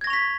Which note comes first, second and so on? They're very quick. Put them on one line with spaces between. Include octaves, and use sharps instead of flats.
G#6 A#6 C#6 F7 B6